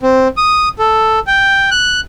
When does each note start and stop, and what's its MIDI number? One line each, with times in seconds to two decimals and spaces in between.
0.03 0.28 60
0.37 0.69 87
0.79 1.19 69
1.27 1.70 79
1.71 2.00 90